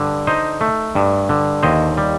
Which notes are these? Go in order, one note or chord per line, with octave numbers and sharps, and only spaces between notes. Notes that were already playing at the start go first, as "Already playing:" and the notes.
Already playing: G2 D3
D#4 C5 D#5
A3
G2
D3
D#2 C5 D#5
G3